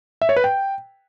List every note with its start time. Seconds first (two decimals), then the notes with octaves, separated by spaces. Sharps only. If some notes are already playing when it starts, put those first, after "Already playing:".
0.22 E5
0.29 C#5
0.36 B4
0.44 G5